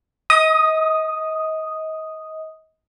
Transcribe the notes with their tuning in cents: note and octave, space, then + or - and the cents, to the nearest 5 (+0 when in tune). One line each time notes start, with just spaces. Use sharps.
D#5 +30 D#6 +0